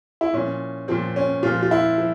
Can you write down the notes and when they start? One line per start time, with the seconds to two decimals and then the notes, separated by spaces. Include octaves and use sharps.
0.21 E4
0.33 A#2 F3 C#4
0.88 A#2 F3 C4
1.16 C#4
1.43 A#2 F3 F4
1.62 F4
1.71 E4
1.98 F3